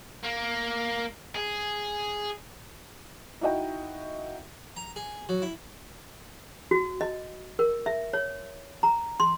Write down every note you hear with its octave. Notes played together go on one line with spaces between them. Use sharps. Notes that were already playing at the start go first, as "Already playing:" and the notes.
A#3
G#4
D#4 E4 F#4 D#5 G5
A#5
G#4
F#3
E4
F#4
D#5
A#4
E5
C#5
A#5
C6